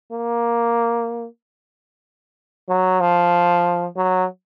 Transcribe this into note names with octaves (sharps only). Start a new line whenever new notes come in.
A#3
F#3
F3
F#3